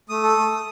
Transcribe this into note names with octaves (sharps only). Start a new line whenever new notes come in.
A3 D#6
A4
A3
A3